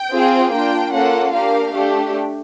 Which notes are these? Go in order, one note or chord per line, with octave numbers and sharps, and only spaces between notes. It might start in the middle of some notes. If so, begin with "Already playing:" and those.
Already playing: G5
C4 F4 G#4
A#3 D4 F4 G5
A#3 C#4 F4 A4 F#5
A#3 D4 G4 F5
A3 D4 G4